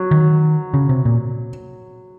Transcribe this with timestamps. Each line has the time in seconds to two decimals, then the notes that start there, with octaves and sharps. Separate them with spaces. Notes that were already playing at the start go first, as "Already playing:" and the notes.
Already playing: F#3
0.11 D#3
0.74 C#3
0.89 C3
1.05 A#2